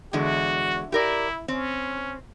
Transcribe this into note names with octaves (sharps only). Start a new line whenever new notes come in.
E2 D3 G#3 F#4
E4 G4 A#4 D5
C4 C#4